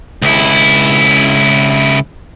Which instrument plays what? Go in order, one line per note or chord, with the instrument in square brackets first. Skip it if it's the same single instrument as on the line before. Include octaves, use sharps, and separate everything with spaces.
[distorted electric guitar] C#2 E4